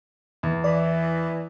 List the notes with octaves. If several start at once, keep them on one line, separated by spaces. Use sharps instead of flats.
E2
E3 D5